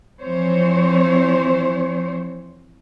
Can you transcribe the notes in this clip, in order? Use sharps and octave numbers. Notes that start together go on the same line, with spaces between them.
E3 F3 C4 C5 C#5